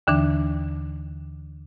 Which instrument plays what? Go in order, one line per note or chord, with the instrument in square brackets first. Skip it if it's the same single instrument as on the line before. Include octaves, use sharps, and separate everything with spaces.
[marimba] D#2 D3 E3 D4